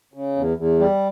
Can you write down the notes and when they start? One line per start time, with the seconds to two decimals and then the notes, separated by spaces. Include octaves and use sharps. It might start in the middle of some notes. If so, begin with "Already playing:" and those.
0.14 C#3
0.36 E2
0.57 E2
0.79 G3